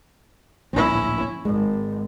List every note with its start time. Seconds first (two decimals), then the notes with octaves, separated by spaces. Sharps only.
0.73 D1 A#1 C#4 E4
1.45 G#1 G#3